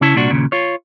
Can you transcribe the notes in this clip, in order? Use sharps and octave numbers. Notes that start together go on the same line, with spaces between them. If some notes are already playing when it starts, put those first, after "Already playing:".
C#3 C#4 E4 A5
C2 A#2 D4 F#4
D#2 A#2 C#3
F4 C#5